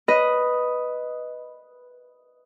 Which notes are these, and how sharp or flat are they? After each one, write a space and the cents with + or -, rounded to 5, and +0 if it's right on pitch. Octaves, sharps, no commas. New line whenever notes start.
B4 +0 D#5 +0